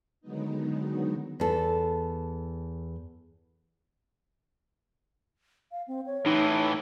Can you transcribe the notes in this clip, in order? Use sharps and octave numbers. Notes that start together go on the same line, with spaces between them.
D3 D#3 F#3 G#3 B3 D#4
E2 A4
F5
C4
C#5
A2 E3 D#4